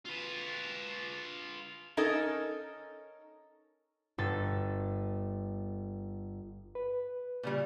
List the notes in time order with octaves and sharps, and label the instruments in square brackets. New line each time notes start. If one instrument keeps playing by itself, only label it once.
[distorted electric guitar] F4 B4
[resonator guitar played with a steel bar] C#4 D#4 A4 A#4 D#5
[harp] G1 A4 A6
[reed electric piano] B4
[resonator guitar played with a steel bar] A#2 C#3 G3